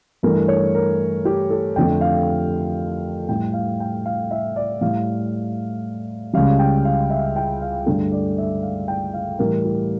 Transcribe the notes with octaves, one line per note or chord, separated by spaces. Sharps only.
G2 E3 A3 A#4
C#5
A#4
G4
A4
F2 D3 F3 A3 G5
F5
A2 G3 G5
F5
G5
F5
E5
D5
A2 G3 F5
C#2 C#3 G3 F5
G5
F5
E5
G5
F5
G2 D3 A3 A4
D5
E5
F5
G5
F5
A2 E3 G3 A#4
G4